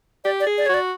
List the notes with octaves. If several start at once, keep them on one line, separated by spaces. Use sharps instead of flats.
G4 D5
D5
G#4
D5
F#4 C#5
D5